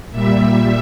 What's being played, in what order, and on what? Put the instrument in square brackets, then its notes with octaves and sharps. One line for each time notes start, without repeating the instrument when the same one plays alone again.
[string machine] A#2 G3 E5